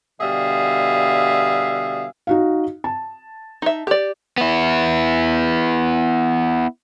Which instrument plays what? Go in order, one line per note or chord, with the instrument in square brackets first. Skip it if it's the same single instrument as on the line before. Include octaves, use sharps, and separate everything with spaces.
[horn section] B2 D3 G3 G#4 E5 F5
[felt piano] D#4 F#4 F5
A5
[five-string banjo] D#4 E5
G4 D5
[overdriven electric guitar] B3 E4